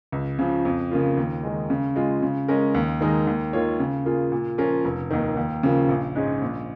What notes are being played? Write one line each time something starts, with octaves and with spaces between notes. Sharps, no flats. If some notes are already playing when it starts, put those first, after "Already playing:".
C#2
C#3 F3
F2
C#3 A#3 F4
D#2
D#3 G#3
C#3
G#3 F4
C#3
G#3 C#4 A#4
D#2
D#3 G#3 D#4 A#4
D#2
D#3 A#3 F4 C#5
C#3
A#3 F4 G#4
A#2
F3 C#4 F4 A#4
F1
D#2 D#3
D#2
C#3 F3 A#3
A#1
G#2 G#3 C#4 G#4
A#1